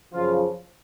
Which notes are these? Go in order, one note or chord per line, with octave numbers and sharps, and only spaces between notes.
F#2 C#3 F3 F4